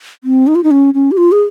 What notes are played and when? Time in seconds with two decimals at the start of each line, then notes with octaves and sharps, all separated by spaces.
0.24 C4
0.47 D#4
0.55 F4
0.64 D#4
0.71 C#4
0.94 C#4
1.11 G4
1.17 F4
1.32 G#4